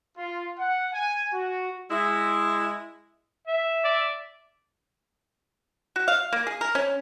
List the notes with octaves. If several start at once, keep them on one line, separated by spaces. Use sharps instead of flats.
F4
F#5
G#5
F#4
G#3 E4
E5
D5
F#4
F5
A#3
G#4
A#4
C#4